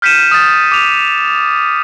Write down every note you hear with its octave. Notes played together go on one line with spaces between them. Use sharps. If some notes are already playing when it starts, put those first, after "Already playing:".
F6 G6 B6 C#7 D#7 E7
D#6 A6
D6 F7